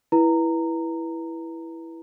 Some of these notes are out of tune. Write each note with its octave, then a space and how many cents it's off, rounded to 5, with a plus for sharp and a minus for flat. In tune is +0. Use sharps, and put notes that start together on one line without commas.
E4 +0 B4 -25 A#5 -15